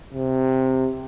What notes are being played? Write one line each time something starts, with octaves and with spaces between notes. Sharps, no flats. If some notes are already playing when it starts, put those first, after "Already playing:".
C3